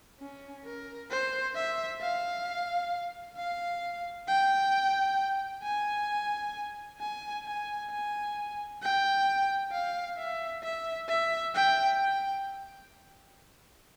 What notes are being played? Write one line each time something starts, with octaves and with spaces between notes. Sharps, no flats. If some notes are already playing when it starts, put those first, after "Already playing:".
C#4
A#4
C5
E5
F5
F5
G5
G#5
G#5
G#5
G#5
G5
F5
E5
E5
E5
G5
G5